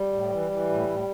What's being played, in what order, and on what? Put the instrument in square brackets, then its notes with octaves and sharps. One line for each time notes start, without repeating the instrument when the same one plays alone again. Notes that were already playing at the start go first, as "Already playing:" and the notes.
Already playing: [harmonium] G3
A2
E3
E3
A2
A2